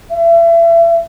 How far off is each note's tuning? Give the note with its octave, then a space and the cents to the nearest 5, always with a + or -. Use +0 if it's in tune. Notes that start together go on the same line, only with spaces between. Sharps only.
E5 +35